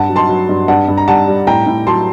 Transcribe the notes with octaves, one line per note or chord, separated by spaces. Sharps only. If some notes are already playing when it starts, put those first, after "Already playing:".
Already playing: G2 F#5 A5
F#3
A5 C6
F#3
G2
G2 F#5 A5
G2
A#5
G3 F#5 A5
G3
A2 G5 A#5
A2
F#3 A5 C6